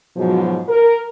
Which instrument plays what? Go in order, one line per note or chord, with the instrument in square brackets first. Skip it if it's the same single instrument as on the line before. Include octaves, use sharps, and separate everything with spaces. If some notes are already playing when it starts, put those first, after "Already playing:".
[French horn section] G#2 B2 F3 F#3
A#4